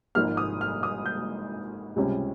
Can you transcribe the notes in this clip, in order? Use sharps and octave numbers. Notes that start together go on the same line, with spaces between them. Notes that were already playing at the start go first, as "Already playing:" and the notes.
G#1 G#2 F3 A#3 F6
D#6
F6
D#6
G6
C#2 C3 G3 C#4